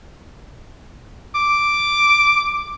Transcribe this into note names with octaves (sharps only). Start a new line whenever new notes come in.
D6